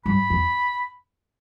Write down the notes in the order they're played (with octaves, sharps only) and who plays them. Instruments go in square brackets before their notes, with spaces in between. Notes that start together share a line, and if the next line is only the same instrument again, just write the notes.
[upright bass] G2 [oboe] B5
[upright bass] E2